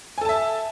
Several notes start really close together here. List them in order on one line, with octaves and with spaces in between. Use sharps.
G#5 A4 A5 E5